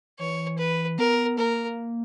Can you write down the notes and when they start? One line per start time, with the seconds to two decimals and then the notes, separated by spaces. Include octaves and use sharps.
0.19 E3 C#5
0.58 B4
0.98 B3 A#4
1.38 A#3 A#4